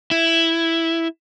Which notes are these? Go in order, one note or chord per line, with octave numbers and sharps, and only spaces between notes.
E4